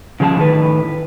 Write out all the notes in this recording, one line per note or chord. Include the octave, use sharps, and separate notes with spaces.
C#3 F3 G#4 C5 A5
A2 D#3 B4